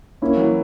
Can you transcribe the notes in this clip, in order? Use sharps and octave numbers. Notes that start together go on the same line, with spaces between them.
A#3 C#4 E4
E3 F#3